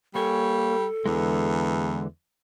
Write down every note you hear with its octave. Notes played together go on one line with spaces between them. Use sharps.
G3 A#3 A4 C#5 G#5
E2 D3 E3 G#3